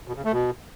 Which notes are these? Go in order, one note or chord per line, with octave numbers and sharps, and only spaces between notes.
B2
C#3
A3
B2